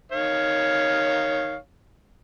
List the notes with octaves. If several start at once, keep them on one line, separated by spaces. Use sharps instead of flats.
D#3 C#5 F5